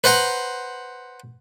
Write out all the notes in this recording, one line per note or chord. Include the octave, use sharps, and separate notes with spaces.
B4 C5 F#5 A#5